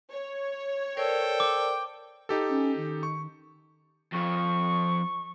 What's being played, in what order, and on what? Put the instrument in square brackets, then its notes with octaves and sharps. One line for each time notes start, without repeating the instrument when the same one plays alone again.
[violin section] C#5
[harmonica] A4 G5 [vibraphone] A#4 C5 D5
[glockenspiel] D6
[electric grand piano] D#4 G4 A4
[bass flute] C#4
D#3
[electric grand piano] C#6
[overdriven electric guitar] F2 F3 [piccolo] C#6